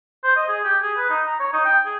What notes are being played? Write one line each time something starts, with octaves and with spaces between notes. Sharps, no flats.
C5
D#5
G#4
G4
G#4
B4
D#4
A#5
C#5
D#4
G5
G#4